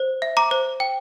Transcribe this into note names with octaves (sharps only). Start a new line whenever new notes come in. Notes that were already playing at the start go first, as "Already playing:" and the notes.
Already playing: C5
E5
A#5 D6
C5
G5